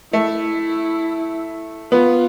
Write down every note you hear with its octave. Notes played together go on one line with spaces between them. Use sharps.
A3 E4
B3 F4